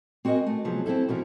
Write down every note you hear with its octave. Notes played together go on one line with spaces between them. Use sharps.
C4 F#4 A#4 C#5 D#5 G#5
A3
C3 F3 F#3 B3 G#4
C4 C#4 E4 A4
B2 E3 F3 E4 F#4 A#4